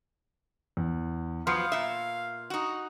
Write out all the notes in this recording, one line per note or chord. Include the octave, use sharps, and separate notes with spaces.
E2
F3 F#3 B3 F5 C6
A#2 E5
D#4 F#4